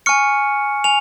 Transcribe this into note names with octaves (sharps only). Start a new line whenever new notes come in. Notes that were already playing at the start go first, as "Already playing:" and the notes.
G#5 C#6 F6 C#7
G#5 F7